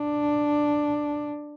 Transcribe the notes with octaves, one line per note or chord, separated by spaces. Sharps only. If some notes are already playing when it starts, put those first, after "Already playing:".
Already playing: D4